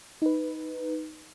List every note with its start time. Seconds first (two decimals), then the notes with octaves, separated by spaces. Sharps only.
0.22 D#4 B4